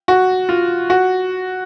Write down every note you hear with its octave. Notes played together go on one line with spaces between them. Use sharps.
F#4
F4
F#4